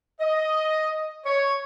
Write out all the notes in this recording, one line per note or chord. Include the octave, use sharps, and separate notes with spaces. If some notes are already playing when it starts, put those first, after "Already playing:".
D#5
C#5